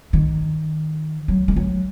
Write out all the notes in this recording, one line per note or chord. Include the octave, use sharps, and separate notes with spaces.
D#3
F#3
G#3
F#3